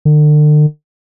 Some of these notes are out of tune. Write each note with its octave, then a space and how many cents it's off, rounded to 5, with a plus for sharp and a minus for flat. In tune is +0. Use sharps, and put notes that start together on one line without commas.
D3 +40